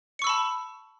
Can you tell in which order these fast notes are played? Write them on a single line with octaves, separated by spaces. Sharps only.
C#7 C#6 E6 B5 A5